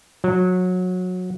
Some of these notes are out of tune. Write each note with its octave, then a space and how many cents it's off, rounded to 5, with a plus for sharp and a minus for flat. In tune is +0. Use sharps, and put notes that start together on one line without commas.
F#3 -20